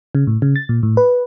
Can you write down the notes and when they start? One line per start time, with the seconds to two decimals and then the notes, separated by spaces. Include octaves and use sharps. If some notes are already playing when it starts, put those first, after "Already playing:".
0.15 C#3
0.27 A2
0.42 C#3
0.56 A6
0.69 A#2
0.83 A2
0.97 B4